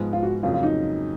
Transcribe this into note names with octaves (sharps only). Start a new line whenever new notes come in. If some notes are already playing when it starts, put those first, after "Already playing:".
Already playing: G#2 F3 G#3 B3
F4
F#4
F2 C#3 F#3 A#3 F4
F4
D#4